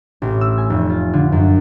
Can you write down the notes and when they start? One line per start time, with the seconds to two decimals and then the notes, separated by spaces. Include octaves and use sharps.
0.22 A1
0.41 E6
0.58 G#5
0.70 F1
0.90 F4
1.13 D3
1.32 F#2